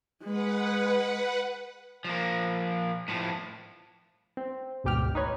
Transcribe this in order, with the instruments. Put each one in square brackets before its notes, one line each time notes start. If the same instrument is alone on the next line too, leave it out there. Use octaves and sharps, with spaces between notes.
[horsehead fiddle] G#3 [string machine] B4 F#5
[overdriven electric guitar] F3 A#3
A2 F3
[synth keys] C4
G#1 D2 B2 G4 G5 F6
D#4 B4 C#5